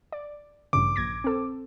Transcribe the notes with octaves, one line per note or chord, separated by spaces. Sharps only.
D5
A1 G2 C#3 D6
A#1 G#6 A#6
C4 A4